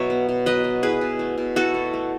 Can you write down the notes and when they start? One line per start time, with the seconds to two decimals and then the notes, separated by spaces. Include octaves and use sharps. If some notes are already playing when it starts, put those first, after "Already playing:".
Already playing: B2 F#3 C#5 E5
0.10 B3
0.29 B2
0.46 F#3 B4 D#5
0.64 B2
0.83 E4 G#4 B4
1.01 B2
1.19 A3
1.38 B2
1.56 E4 F#4 A4
1.74 B2
1.93 A3